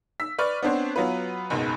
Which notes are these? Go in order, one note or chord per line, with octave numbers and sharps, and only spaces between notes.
E6 B6
B4 D5 C#6 F6
B3 C4 D4 C5 C#5
F#3 B3 F4 B4
F#1 C#2 G#2 B2